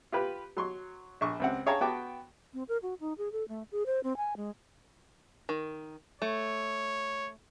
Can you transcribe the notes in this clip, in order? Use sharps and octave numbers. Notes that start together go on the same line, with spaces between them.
F4 G4 B4
F#3 C6 C#6
A#1 C#6
C#2 C4 F#5
G#4 C#5 F5 G5 A5 A#5
B3 F#4 G5 A5 D6
C4
A#4
F#4
D#4
G#4
A4
A3
G#4
C5
C4
G#5
G#3
D#3
A3 C#5